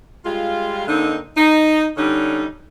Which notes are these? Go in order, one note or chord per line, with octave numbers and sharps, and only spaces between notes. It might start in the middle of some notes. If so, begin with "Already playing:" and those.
G3 G#3 F4
D3 A#3 C4 D#4
D#4
D3 G3 C#4 D#4